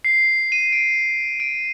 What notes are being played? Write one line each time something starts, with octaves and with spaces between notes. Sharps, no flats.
C7
D#7
D7
D7